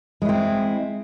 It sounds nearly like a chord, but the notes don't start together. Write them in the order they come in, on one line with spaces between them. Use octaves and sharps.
G#3 E4 C4